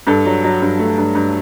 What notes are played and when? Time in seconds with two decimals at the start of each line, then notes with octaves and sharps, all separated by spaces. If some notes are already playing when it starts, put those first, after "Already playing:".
0.07 G2 A4
0.25 F#3
0.44 F#3
0.62 G2
0.79 A3
0.98 G2
1.15 G2